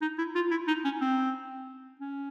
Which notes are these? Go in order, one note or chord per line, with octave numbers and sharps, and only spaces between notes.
D#4
E4
F4
E4
D#4
C#4
C4
C#4